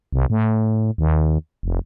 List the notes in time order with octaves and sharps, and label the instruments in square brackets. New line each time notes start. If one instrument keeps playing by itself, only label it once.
[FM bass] C2
A2
D#2
F1